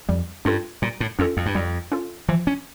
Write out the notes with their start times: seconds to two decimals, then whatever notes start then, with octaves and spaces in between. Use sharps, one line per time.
0.09 F2 G3
0.45 G2 C#4 F4 A4
0.82 A#2 G3
1.00 A2
1.19 F2 C#4 F4 A4
1.37 F2
1.46 G2
1.55 F2 G3
1.92 C#4 F4 A4
2.29 E3 F3
2.47 C#4